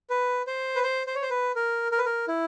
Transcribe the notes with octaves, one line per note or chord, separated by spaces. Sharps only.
B4
C5
B4
C5
C5
C#5
C5
B4
A#4
A#4
B4
A#4
E4